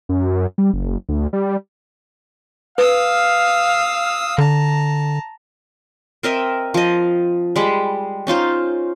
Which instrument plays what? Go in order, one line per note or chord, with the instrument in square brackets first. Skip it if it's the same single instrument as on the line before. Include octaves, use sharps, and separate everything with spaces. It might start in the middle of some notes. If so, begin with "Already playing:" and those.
[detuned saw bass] F#2
G3
F#1
D2
G3
[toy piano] B4 [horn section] F5 [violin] D#6 E6
[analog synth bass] D3 [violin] A5 A#5
[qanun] C4 A#4 D#5 E5
F3 D#5
G3 G#3 B5
C#4 D#4 F4 C5